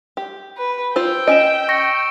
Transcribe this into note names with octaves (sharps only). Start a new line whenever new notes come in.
G4
B4
F4 C5 G5 E6
C#4 D#5 D7 E7
C#6 A#6 C#7